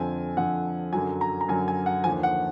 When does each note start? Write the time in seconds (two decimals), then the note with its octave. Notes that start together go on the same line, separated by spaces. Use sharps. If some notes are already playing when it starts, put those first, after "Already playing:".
Already playing: F2 D3 F3 G#5
0.37 F2 D3 F3 F#5
0.93 F#2 D3 F#3 G#5
1.21 A#5
1.41 A#5
1.48 F#2 D3 F#3 G#5
1.68 G#5
1.86 F#5
2.04 D#2 D3 F3 G#5
2.23 F#5